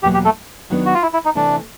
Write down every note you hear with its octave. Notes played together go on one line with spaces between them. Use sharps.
E2 B2 F#3 A#3 G4
G4
A3 A4
D#3 F#3 B3 D4
F#4
F4
E4
E4
D#4
C3 E3 A3 D4